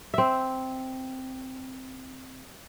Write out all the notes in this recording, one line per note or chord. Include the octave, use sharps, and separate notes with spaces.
C4 E5